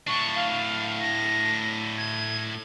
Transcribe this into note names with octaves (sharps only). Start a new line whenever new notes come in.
A2 D4 C#6
F5
A#6
G#6